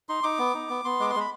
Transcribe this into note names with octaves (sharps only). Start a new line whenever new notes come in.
D#4 C6
D#4 D6
B3
D#4
B3
B3 C6
G#3 D6
C6
G#3
B5